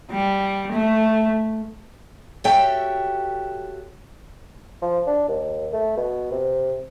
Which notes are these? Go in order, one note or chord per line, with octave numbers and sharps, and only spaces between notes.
G3
A3
F#4 G4 A4 C#5 E5 G5
F3
D4
D#2
A3
B2
C3